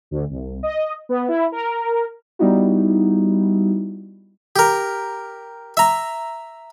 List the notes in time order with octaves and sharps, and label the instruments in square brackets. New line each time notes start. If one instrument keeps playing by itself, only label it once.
[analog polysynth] D2
C2
D#5
B3
E4
A#4
[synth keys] G3 B3 D#4 E4 F#4
[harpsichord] G4 A#4
E5 A#5